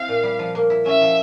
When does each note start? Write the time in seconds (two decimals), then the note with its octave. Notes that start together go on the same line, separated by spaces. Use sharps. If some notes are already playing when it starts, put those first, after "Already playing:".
Already playing: C4 E4 F5
0.08 A#2
0.23 G3
0.39 F3
0.55 A#3
0.70 E4
0.85 C#4 E5
1.01 F3